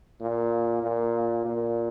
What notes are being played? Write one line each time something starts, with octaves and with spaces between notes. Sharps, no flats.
A#2
A#2
A#2